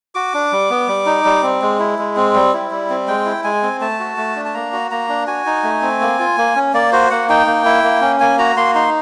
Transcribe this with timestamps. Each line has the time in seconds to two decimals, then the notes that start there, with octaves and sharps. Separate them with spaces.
0.15 F#4 D6
0.34 D4
0.52 G3
0.70 B3
0.88 G3
1.06 D#4
1.25 G3
1.43 C4
1.62 G#3
1.79 E4
1.99 G#3
2.16 C4
2.35 G3
2.53 E4
2.71 G3
2.90 C4
3.08 G#3 G5
3.26 E4
3.44 G#3 G#5
3.63 C4
3.81 A3 A5
4.00 F#4
4.17 A3
4.36 D4
4.45 A5
4.54 A#3 A#5
4.73 F#4
4.91 A#3 A#5
5.09 D4
5.27 F#4 G#5
5.46 D#4
5.64 A3
5.82 C4
6.01 A#3
6.19 F4
6.38 A#3
6.56 C#4
6.73 A#3 D5
6.92 F#4 C5
7.10 A#3 F#5
7.29 D#4 G5
7.47 A#3
7.65 E4
7.84 A#3
8.01 C#4
8.20 A#3 G#5
8.39 F#4 A#5
8.56 A#3 C6
8.75 D#4 C6